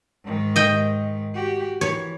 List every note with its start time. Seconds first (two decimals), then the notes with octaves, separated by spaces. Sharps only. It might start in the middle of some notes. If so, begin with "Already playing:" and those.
0.24 G#2 D#3
0.56 D#5 G5
1.35 F#4 G4
1.81 E3 C#5